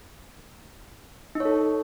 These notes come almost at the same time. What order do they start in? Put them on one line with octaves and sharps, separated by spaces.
D#4 C#5 A4